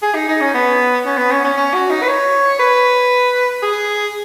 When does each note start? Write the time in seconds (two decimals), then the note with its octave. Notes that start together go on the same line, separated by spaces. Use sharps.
0.02 G#4
0.15 D#4
0.28 D#4
0.40 C#4
0.54 B3
1.06 C#4
1.18 B3
1.32 C#4
1.44 C#4
1.57 C#4
1.74 F#4
1.90 D#4
2.02 B4
2.08 C#5
2.59 B4
3.62 G#4